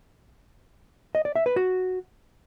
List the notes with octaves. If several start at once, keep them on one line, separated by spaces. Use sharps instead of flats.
D#5
D5
E5
B4
F#4